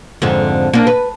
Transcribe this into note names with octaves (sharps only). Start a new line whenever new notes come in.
F2 G#2 D3
A#3 D4
B4